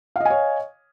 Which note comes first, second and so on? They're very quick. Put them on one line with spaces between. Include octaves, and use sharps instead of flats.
F5 D#5 G#5 C#5